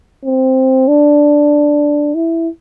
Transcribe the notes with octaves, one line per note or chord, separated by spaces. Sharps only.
C4
D4
E4